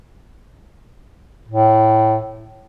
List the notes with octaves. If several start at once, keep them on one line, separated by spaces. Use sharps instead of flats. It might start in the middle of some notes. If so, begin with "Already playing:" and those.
A2